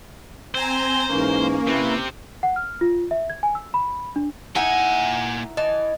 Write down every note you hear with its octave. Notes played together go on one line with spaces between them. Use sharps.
C4 C5 G#5 A#5
G#2 E3 A#3 C#4
C3 C4 E4 B4
F#5
F6
F4
E5
G#6
G#5
E6
B5
D4
A#2 D#4 E4 F#5 G#5
E3 D#5 A5